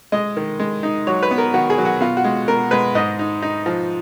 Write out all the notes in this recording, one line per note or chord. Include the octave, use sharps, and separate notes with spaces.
G#3 D#5
D#3
G#3
D#4
F#3 C#5
B4
B3
A#4
D#3 F#4
G#4
F#3
F#4
B2 F4
F#4
G#3
B2 A#4
G#3 B4
G#2 D#5
D#4
D#4
F3